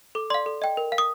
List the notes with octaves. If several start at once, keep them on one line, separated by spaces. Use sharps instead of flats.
A4 D6
D5 F5 C6
A4
D#5 G5
A#4
F5
D#6